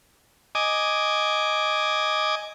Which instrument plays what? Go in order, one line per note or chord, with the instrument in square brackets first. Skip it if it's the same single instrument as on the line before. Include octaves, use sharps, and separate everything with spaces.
[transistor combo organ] D#5 G#5 D6